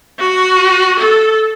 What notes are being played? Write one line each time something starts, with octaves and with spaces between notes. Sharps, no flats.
F#4
A4